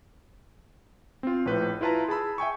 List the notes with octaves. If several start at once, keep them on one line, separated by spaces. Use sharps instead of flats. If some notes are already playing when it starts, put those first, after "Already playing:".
C4 F4
A#1 A2 B4 G6
E4 F4 B4 A5 A#5
G#4 A5 B5 E6
E5 G5 G#5 C#6